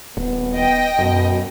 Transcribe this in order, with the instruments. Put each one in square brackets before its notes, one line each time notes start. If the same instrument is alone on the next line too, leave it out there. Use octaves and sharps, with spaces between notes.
[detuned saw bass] D#1 [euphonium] B3
[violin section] D#5 G5
[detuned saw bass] F#2 [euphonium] B2